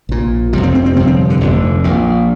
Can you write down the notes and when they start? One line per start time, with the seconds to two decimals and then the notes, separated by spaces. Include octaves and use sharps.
0.09 A#1 A#2
0.53 F1 F2 C3 G3
0.63 C4
0.75 C4
0.86 C4
0.96 C3 C4
0.99 G1 F2
1.07 C4
1.30 D3
1.41 F1 F2 D3
1.84 A#1 A#2